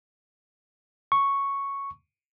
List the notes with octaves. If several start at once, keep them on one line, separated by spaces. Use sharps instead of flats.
C#6